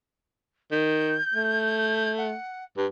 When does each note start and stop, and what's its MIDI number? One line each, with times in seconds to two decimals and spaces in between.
0.71 1.16 51
0.71 2.12 91
1.34 2.34 57
2.18 2.64 78
2.77 2.87 43